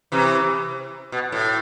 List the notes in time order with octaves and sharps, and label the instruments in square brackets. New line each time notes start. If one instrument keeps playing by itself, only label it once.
[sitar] C3 E3
B2
A2